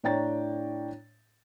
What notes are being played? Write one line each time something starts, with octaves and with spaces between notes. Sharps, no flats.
A2 D4 C#5 G5 A#5 A6